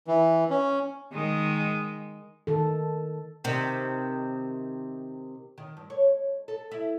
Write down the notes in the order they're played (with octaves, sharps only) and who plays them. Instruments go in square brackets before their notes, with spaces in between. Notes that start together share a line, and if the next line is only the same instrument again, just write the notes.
[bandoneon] E3
C#4
[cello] D#3 G#3
[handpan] D#3 A4
[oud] C3 D#3
D#3
G2
C#5
A4
E4